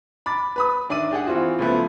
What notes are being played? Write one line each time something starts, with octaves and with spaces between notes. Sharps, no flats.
B5 D6 A6
B4 B5 D#6
D#3 D4 D5 E5 D6 D#7
D4 G4 G#4 F#5
E3 C4 F4 F#4
C#2 F3 A3 B3